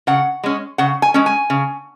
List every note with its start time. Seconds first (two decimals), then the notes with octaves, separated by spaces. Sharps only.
0.07 C#3 F#5
0.44 G#3 C#4
0.78 C#3 F#5
1.02 G#5
1.14 G#3 C#4
1.26 G#5
1.50 C#3